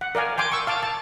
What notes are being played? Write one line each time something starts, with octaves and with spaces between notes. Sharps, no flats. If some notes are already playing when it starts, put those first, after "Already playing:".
F#5
A#4 D5 F5 G#5
G5 G#5 C6 D6
C#6 E6
F5 A5 D6
A5